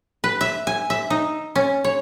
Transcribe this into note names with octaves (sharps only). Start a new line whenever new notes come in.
B4
E5
G#5
E5
D#4
C#4
C#5